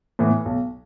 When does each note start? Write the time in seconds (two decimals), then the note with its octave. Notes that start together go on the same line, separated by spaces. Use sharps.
0.19 A2 E3 B3
0.45 B1